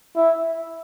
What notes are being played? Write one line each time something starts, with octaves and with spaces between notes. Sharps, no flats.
E4